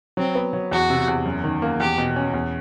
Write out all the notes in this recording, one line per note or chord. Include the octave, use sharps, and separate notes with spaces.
F#3 C4
B3
F#3
E2 F#4
C3
E2
F#2
D#3
A#3
E2 G4
B2
C#4
E2